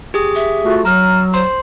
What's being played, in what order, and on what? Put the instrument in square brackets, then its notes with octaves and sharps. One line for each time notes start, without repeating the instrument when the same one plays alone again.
[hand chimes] G4 G#4 D#6
[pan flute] E5
[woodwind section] A3 F4 F#4
[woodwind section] F#3 [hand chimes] A#5 [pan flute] F6
[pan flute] C5 [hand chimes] C6